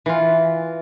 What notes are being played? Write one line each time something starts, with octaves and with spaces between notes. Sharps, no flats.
E3 F4